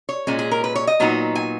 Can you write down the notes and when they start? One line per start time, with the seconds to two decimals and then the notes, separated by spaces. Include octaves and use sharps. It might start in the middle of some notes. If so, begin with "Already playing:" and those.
0.09 C#5
0.27 A#2 G#3 C#4
0.39 G#4
0.51 A#4
0.64 B4
0.75 C#5
0.87 D#5
1.00 A#2 F#3 B3 D#4
1.35 G#5